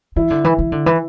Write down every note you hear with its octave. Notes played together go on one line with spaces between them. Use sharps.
E3 E4
D3
E3
E3
D3
E3